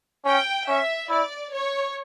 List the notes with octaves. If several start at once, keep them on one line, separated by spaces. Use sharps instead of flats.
C#4 G5
C#4 E5
E4 D5
C#5